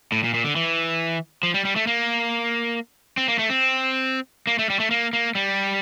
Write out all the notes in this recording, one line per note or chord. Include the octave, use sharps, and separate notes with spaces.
A2
A#2
A#2
D3
E3
F3
G3
G3
A3
A#3
C4
A#3
A3
C4
A#3
A3
G3
A3
A#3
A#3
G3